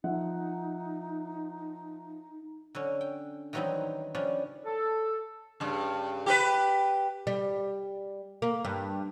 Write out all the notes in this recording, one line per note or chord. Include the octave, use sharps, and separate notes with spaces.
F3 D#4 E5 F#5
D3 F#3 C#4
G5
D#3 E3 F#3 G3 C4 D#4
C#3 F3 G3 C#4 D4
A4
G2 C#3
G4 A#4 B4
G3
A#3
G2